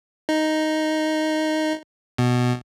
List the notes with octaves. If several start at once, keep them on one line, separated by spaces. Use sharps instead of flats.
D#4
B2